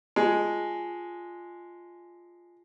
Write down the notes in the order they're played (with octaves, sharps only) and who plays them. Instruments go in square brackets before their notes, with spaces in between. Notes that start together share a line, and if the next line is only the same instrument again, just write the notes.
[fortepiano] G#3 [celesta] F4 G#5 A5